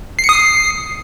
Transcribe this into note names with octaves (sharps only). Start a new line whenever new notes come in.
C7
C#7
D#6
C7